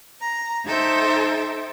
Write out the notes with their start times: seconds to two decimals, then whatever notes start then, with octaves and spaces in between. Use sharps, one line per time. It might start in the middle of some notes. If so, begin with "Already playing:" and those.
0.21 A#5
0.65 D#4 A4 C5 E5 G5